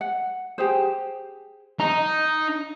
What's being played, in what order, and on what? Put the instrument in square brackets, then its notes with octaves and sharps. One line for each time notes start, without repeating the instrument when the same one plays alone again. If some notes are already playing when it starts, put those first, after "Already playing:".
[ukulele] F#5
G4 G#4 C5
[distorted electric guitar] D#4 [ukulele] A#5